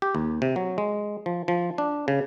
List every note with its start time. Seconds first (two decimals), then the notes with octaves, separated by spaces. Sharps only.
0.02 G4
0.15 D#2
0.42 C3
0.56 F#3
0.78 G#3
1.26 F3
1.48 F3
1.78 D4
2.08 C#3